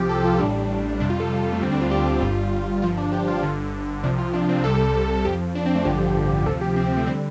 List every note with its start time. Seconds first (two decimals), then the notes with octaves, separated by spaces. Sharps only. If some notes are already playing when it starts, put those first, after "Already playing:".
Already playing: C2 C3 F3 G4
0.09 A4
0.24 F4
0.39 A1 A2 G3 D4
1.00 F2 C3 G3 D4
1.10 F4
1.20 A4
1.53 A3
1.61 D2 D3 G3 C4
1.72 D4
1.82 F4
1.91 G4
2.06 G4
2.21 G1 G2 G3 F4
2.82 G1 G2 F3 F4
2.98 D4
3.12 G4
3.28 F4
3.43 G1 G2 D3
4.03 C2 C3 F3 D4
4.18 F4
4.34 D4
4.49 C4
4.64 C2 C3 G3 A4
5.25 F2 F3 G4
5.55 D4
5.66 C4
5.75 A3
5.85 A1 G2 D3 F3 G4
6.46 D2 C3 F3 A4
6.61 G4
6.76 C4
6.86 C4
6.97 A3
7.07 D3 G3 C4